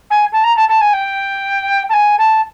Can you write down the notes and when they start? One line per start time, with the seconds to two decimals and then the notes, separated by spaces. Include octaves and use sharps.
0.11 G#5
0.33 A5
0.44 A#5
0.56 A5
0.69 A5
0.81 G#5
0.93 G5
1.89 A5
1.94 G#5
2.19 A5